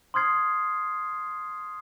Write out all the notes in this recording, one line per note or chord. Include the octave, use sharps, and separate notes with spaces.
C6 D#6 F6 G#6 C7